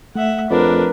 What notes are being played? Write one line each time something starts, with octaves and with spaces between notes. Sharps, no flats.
A3 E5 F#5
F2 D4 A#4 B4